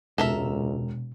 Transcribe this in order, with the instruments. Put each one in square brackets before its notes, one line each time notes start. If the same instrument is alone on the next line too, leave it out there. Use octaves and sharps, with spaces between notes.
[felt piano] E1 [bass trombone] C#2 [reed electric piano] B2 [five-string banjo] A4 A#4 E5